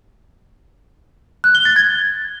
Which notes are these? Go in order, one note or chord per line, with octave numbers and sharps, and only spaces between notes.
F#6
G7
A6
G#6